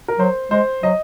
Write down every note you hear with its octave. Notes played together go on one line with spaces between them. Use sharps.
A#4
F#3 C5
G#3 C5
F#3 D#5